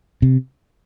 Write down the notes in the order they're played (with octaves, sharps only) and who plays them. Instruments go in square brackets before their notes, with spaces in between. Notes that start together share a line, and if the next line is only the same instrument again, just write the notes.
[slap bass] C3